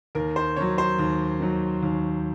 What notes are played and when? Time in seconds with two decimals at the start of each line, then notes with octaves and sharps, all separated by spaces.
0.15 D#2 A#4
0.36 C5
0.56 D#3 F#3 C#5
0.78 C5
0.99 D#2
1.40 D#3 F#3
1.83 D#2